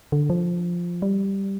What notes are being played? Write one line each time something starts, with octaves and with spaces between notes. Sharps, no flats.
D3
F3
G3